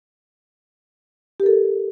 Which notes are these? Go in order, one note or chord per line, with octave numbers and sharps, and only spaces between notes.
G4 A4 A#4